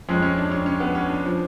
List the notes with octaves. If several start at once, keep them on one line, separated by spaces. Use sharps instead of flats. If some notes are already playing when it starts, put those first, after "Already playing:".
F2 F3 G#3 C#4
C#4
D4
C#4
C#4
B3
C#4
D4
F3